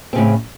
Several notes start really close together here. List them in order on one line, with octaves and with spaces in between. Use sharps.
C4 C#3 A2